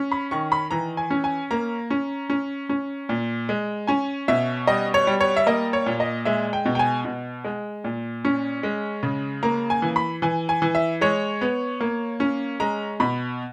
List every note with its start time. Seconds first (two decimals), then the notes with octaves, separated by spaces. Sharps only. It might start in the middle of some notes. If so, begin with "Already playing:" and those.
Already playing: C#4
0.12 B5
0.31 D#3 C#6
0.52 B5
0.71 E3 A#5
0.97 G#5
1.10 C#4
1.24 G#5
1.51 A#3 A#5
1.90 C#4
2.30 C#4
2.69 C#4
3.09 A#2
3.49 G#3
3.87 C#4 G#5
4.28 B2 E5
4.67 G3 D#5
4.94 C#5
5.07 G3
5.21 C#5
5.37 E5
5.46 A#3 D#5
5.73 C#5
5.86 A#2
6.00 D#5
6.25 G#3 E5
6.53 G5
6.65 B2
6.75 G5
6.79 G#5
7.05 B2
7.44 G#3
7.84 A#2
8.25 C#4
8.63 G#3
9.03 C#3
9.43 A#3 A#5
9.70 G#5
9.82 E3
9.96 B5
10.22 E3 G#5
10.49 G#5
10.62 E3
10.75 E5
11.01 G#3 C#5
11.41 B3
11.80 A#3
12.20 C#4
12.60 G#3 A#5
13.00 B2 B5